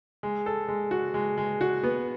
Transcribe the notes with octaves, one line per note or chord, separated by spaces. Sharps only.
G#3
A4
G#3
F#4
G#3
G#3
F#4
B3